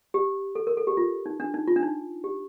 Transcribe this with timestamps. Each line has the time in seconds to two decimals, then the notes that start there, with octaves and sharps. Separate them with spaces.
0.14 G4
0.55 A4
0.67 A#4
0.77 A4
0.87 G4
0.97 F4
1.26 D#4
1.40 D4
1.54 D#4
1.67 F4
1.76 D4
1.83 D#4
2.24 G4